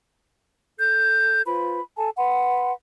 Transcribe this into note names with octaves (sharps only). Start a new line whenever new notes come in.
A4 G6
F4 B4 C5 B5
A4 G#5 A5
B4 F#5 B5 C6